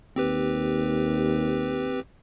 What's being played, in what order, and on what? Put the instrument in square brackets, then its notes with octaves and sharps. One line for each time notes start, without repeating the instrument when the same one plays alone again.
[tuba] D#2 [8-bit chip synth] C4 G4 B4